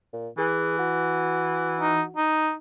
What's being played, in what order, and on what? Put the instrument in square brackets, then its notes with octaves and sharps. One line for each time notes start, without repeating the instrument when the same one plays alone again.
[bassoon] A#2
[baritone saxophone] E3 [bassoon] G#4
[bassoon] F#4
[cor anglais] D#4
D#4